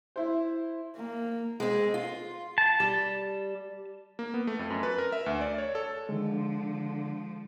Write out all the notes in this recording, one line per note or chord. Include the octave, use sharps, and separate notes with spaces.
E4 C5
A#3
G#3 C4
F4
A5
G3
A#3
B3
A3
F2
F#2
B4
A#4
E5
D2
D5
C#5
A4
D3 D#3 F3 G#3